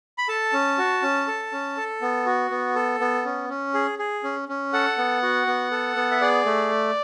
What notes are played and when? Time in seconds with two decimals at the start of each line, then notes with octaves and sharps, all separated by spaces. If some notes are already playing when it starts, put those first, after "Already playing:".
0.18 B5
0.28 A4 A5
0.53 C#4
0.78 F#4
1.02 C#4
1.27 A4
1.52 C#4
1.77 A4
2.02 B3
2.26 F#4
2.51 B3
2.75 A4
3.00 B3
3.25 C#4
3.49 C#4
3.74 G#4
3.99 G#4
4.24 C#4
4.49 C#4
4.73 A4 F#5
4.98 B3
5.22 F#4
5.47 B3
5.71 A4
5.96 B3
6.11 E5
6.21 G#4 D5
6.46 A3